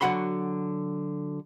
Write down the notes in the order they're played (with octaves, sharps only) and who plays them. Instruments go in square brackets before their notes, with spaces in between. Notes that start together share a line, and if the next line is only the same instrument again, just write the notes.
[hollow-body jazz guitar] D3 F#3 F#4 F#5 B5 C6